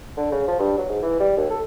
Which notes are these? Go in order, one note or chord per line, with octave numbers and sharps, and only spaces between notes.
D3
C#3
F3
G2
F#3
G#2
E3
G3
D#2
A4